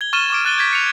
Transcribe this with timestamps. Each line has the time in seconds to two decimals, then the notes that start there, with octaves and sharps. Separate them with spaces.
0.01 G#6 G7
0.13 C#6 F6 A6 D#7 E7 G7
0.30 C#6 D6 D7
0.45 F6 F#6 A6 D#7 G7
0.58 G6 G#6 B6
0.73 C#7 F7